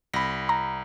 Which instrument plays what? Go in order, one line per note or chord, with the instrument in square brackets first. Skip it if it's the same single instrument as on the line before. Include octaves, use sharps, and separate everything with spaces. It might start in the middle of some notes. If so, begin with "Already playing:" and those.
[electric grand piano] C2 B5 [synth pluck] A#6
[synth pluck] A#5